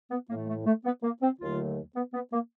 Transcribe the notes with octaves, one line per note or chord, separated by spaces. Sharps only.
B3
A2 E3 A3 A#3
A3
A3
B3
A#3
C4
D#2 D3 F#3 A3 F4
B3
B3
A#3